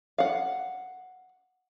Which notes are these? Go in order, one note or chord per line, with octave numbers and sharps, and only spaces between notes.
F5 F#5